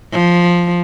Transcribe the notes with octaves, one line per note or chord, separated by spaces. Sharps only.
F3